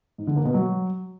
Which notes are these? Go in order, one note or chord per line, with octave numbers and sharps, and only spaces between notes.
G#2
D3
A#3
B2
F#3